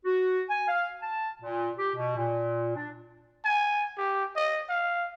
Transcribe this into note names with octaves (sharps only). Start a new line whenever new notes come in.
F#4
G#5
F5
A5
A#2
G4
B2
A#2
D4
G#5
G4
D#5
F5